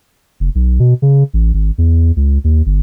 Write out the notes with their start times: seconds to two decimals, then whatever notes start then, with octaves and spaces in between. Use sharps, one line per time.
0.40 F1
0.55 B1
0.80 B2
1.02 C#3
1.34 A1
1.54 G#1
1.78 E2
2.16 C#2
2.44 D#2
2.66 G1